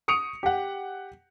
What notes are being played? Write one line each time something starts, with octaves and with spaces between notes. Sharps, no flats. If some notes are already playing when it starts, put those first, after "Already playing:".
C#6 D#6 C#7 D7 F7
G4 F#5